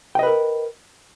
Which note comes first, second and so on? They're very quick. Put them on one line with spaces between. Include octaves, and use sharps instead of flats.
G5 D#5 B4 A#4